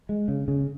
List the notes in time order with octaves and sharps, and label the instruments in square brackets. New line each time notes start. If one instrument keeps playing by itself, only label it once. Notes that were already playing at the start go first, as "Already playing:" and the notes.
[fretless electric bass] G#3
C#3
C#3